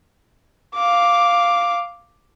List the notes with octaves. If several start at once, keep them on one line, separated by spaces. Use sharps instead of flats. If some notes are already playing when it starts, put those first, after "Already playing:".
F5 D6